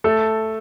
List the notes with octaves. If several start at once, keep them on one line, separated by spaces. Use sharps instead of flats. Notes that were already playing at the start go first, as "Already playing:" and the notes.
A3 A4